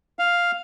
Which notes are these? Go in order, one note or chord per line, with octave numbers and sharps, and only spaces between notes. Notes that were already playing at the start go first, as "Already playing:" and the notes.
F5